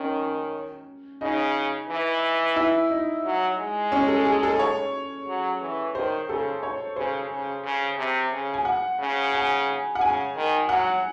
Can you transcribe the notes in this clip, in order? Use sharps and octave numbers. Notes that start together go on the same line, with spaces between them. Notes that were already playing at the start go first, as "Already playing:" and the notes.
Already playing: D#3 C#4
C#3 D#4
E3
E4
D#4
F#3
G#3
C#4
A4
G#4
A4
C#5
F#3
E3
D#3 C5
C#3 A4
C#5
C#3 C5
C#3
C#3
C3
C#3
G#5
F#5
C#3
G#5
F#5
C#3 G#5
D#3
F#3 F#5